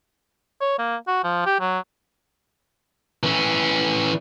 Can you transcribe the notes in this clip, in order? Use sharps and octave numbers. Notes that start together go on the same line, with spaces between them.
C#5
A#3
F#4
F3
G4
F#3
E3 C#4